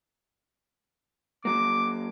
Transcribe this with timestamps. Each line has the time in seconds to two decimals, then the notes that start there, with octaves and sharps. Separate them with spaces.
1.45 F#3 A#3 D6